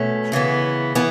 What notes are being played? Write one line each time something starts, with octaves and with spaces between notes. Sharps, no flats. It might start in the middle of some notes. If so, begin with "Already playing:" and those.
Already playing: B2 A3 C#4
C#3 E3 B3
E3 B3